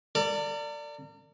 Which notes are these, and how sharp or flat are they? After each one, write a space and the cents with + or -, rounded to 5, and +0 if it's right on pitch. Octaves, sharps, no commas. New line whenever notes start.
A#4 -45 D5 +0